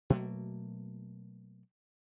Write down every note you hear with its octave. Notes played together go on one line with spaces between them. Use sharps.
B2 F#3 A3 A#3